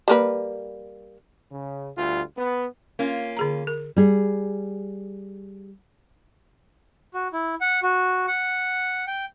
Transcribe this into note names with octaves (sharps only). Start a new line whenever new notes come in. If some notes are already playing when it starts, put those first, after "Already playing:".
G3 A#3 B4
C#3
D2 G3 F4
B3
A#3 C#4 F4
D3 G#4 A#5
A#4
G3 G#4
F#4
E4
F#5
F#4
F#5
G5